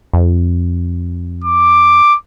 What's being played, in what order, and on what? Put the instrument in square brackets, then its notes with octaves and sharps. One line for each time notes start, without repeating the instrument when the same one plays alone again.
[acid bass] F2
[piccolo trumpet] D6